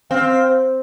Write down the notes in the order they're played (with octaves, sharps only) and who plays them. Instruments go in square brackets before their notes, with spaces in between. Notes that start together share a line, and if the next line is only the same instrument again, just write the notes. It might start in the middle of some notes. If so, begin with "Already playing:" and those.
[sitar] C4 [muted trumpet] F5